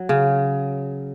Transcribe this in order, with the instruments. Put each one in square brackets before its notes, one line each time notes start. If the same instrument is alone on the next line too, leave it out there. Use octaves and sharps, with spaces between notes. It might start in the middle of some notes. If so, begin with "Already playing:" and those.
Already playing: [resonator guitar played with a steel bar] F#3
[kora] C#3